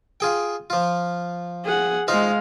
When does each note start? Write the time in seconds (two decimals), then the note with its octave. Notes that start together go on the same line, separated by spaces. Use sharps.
0.20 F4 G#4 G5
0.70 F3 F4
1.64 G#4 F#5
2.08 G#3 D#4 F4 C5 F5